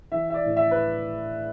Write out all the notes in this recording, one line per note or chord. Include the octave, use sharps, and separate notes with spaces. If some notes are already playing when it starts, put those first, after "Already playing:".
E3 E5
E5
D5
A2
E5
B4